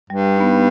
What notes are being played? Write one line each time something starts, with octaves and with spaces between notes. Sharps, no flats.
G2 G3
B3 D#4